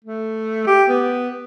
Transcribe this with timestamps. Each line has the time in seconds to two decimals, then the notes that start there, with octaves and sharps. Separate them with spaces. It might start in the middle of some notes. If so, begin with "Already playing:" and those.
0.05 A3
0.67 G4
0.89 B3